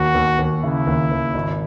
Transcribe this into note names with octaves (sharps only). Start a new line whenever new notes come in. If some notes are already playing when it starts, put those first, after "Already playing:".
Already playing: D#2 F#4
D#2
D#2
C#3 E4
D#2
D#2
G#1